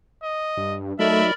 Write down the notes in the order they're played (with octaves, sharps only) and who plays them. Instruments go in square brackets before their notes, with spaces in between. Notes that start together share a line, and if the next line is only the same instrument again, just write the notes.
[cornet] D#5
[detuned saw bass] G2
[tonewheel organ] F#3 D#4 [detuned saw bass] A3 [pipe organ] A#4 D5 B5 [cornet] E5